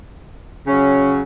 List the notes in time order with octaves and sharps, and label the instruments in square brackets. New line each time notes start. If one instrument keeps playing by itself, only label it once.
[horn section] C#3 F#3 C#4